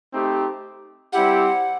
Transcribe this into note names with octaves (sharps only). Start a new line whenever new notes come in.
A3 C4 D#4 G4
G3 C4 E4 G4 F#5